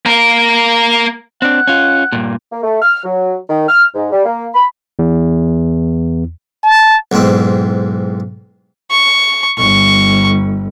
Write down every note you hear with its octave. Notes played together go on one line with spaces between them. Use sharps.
A#3 A#4
C4 D4 F#5
C#4 F4
G2 A#2
A#3
A3
F6
F#3
D#3
F6
G#2
G3
A#3
B5
E2
A5
B1 E2 G#2 C4
C#6
G1 C#6